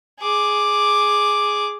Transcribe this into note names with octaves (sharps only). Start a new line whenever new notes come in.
G#4 D6